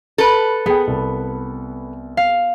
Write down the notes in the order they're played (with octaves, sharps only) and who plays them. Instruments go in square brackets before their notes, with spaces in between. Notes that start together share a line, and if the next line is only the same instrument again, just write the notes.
[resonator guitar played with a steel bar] A4 B4
[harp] B3 [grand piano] G#4 G5
[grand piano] C2
[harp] F5